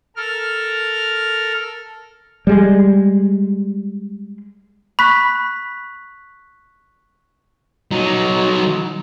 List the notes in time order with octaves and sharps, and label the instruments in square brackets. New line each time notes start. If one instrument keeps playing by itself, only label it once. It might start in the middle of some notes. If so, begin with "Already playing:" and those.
[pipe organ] A4 A#4 F6
[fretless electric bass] G3 G#3
[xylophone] B5 [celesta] C#6 F#6 B6
[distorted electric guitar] F#3 D#4